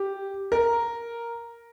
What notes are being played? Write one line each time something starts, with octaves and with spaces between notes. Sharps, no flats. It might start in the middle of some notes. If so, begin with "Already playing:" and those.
Already playing: G4
A#4